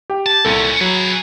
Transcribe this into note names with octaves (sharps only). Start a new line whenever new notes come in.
G4 G5
A5
C2 A#2 C#4 A4
F#3 G#4 B4